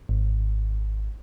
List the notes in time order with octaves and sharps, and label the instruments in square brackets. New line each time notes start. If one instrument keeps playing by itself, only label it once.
[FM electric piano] G#1